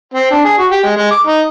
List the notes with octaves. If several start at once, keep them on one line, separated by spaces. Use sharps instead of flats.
C4
D4
G#4
F#4
G4
G#3
G#3
D6
D#4